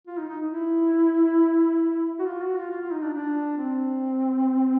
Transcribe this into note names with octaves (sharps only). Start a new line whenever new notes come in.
F4
D#4
D#4
E4
F#4
F4
F#4
F4
F4
F4
D#4
D4
D4
C4